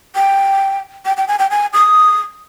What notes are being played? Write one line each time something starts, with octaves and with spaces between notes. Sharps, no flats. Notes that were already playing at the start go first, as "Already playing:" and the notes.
G5
G5
G5
G#5
G5
G#5
D#6